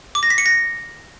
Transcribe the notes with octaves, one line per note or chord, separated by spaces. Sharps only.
D6
A#6
B6
C#7
A#6